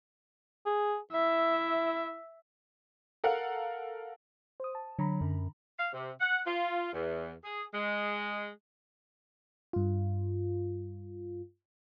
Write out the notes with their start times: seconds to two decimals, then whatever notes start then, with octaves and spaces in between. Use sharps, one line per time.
0.66 G#4
1.12 E4 E5
3.24 A4 A#4 F5 F#5
4.60 C5 D#6
4.75 A5
4.99 D3 F#3 A#5 B5
5.21 F#2
5.78 F5
5.93 C3
6.20 F#5
6.46 F4
6.93 E2
7.43 G#4
7.73 G#3
9.73 G2 F4